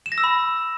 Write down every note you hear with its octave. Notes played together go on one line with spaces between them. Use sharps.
E7
A#6
E6
B5